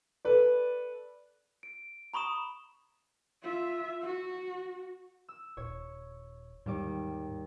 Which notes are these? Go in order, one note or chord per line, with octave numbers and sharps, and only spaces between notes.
A4 B4 D5
D7
A#5 B5 C#6 D#6 E7
F4 E5
F#4
E6
D#1 C#5
D#2 G#2 G3 D6